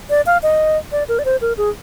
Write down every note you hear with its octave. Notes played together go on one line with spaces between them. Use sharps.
D5
F5
D#5
D5
A#4
D5
C5
A#4
G#4